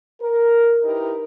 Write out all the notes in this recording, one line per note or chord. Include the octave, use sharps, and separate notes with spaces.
A#4
D#4 E4 G4 A#4 B4 D#5